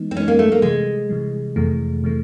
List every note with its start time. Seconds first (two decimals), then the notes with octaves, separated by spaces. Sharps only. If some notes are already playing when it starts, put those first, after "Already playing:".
Already playing: E3 G#3 B3 D#4
0.11 C4
0.16 E3 G#3 B3 C#4 D#4
0.28 A#3
0.39 A3
0.52 A#3
0.62 C3 E3 G3 G#3
1.09 C3 E3 G3
1.56 F2 C3 E3 A3
2.04 C3 E3 A3